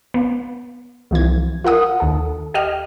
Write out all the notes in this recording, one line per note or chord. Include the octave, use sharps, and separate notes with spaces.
B3
C2 E3 F3 G#6
F4 A#4 F#5 D#6
D#2 A4
G4 D#5 F6